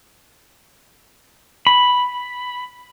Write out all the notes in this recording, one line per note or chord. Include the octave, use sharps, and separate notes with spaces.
B5